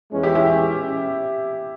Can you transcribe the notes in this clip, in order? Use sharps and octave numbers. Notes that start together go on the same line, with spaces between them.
E2 E3 G#3 C#4
E4 G4
E4 G4